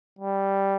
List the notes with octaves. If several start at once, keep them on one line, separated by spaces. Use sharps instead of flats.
G3